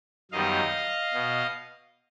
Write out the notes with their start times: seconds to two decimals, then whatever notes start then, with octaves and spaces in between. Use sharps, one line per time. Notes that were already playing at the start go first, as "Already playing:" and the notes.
0.31 F#2 D#3 G3 B3 D#5 F5
1.14 B2